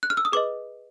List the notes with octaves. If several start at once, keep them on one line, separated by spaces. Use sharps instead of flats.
F#6
F6
E6
D#6
G#4 B4 D#5 D6